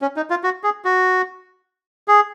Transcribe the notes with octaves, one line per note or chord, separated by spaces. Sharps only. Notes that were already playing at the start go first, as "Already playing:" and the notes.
C#4
D#4
F4
F#4
G#4
F#4
G#4